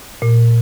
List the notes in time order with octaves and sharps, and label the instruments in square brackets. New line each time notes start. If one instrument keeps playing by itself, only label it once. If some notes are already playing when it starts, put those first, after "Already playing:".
[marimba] A#2